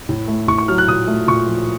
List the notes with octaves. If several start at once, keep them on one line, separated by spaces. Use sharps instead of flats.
A2
A3
A2 C#6
C#6
F#3 F6
F#6
A#2 D#6
A3
A#2 C#6
F3